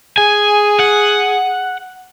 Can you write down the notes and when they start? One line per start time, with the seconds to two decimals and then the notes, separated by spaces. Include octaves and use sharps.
0.18 G#4 G#5
0.80 F#5